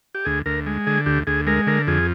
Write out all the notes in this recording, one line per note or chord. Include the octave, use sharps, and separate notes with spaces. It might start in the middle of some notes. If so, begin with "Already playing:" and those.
G4
D2 G#4
D2 A#4
G#3
D3 G#4
D2 G4
D2 G#4
G#3 A#4
D3 A#4
F2 G#4